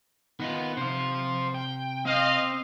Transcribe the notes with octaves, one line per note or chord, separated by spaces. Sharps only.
D#3 B3 D#4 F4
C3 C5 F5
G5
C4 D#5 F5